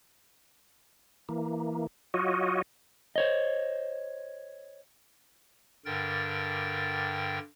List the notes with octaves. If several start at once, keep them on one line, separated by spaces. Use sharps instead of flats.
E3 A#3
F#3 F4 F#4 C#5 D#5
C5 C#5 D#5
G2 D3 A#4 G5 A6